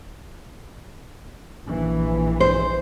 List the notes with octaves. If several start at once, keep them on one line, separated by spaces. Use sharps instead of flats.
A#1 E3
C5